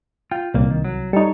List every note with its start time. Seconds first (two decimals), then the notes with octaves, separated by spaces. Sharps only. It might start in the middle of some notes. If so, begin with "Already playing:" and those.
0.31 F4 G5
0.54 C2 A#2 A#3
0.71 D#3
0.85 F#3
1.13 G3 D#4 A4 C#5